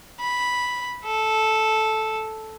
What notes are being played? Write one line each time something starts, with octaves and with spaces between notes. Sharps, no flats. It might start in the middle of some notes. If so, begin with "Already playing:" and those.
B5
A4